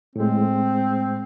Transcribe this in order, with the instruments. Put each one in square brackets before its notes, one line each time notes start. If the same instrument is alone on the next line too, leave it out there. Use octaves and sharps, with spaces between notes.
[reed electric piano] A2 G#3 [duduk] C4